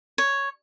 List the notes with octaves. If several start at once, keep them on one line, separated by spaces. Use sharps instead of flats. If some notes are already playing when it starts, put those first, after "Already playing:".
C#5